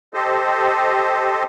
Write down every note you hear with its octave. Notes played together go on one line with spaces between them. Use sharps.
G4 A4 C5 D#5